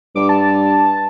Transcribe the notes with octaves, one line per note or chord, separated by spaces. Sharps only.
G2 D6
A5